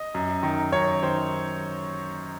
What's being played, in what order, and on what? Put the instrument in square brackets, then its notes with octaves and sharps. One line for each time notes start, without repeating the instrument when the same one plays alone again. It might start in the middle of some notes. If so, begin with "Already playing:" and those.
Already playing: [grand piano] D#5
F#2
D#3
F#2 C#5
D#3 C5